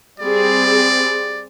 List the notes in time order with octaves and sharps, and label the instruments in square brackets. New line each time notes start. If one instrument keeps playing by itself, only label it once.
[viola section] G3 C4 G#4 [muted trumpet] D5